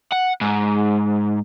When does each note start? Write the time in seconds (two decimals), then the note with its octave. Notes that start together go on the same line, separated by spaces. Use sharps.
0.12 F#5
0.41 G#2